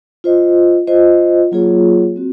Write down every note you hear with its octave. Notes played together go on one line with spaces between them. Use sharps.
F4 C5 D#5
F4 C5 D#5
F#3 A#3 F4 G#4 C#5
C4 F#4